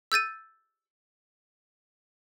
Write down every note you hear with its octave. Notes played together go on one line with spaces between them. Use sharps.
E6 G6 A6 D#7